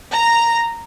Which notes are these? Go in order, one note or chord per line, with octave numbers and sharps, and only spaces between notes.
A#5